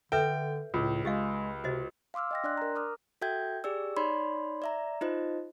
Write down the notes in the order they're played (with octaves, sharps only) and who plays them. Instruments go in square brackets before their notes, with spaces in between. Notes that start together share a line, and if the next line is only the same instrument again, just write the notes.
[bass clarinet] D3 [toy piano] A4 B4 E5 [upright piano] G5
[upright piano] C#2 [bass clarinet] A2
[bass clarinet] G#3 [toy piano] G4 D#5 F5
[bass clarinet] C3 [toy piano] F#4 C5 D#5
[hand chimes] F5 C6 D6 E6 F6
D#5 G5 A#6
D4 D5 C6 F#6
A#4 A#5
D6 D#6 F6
F#4 A4 E5 G5 G6 G#6
G4 G#4 D5 E6
D#4 C#5 D5 B5 C6
D5 E5 A#5
D#4 F4 C5 D#5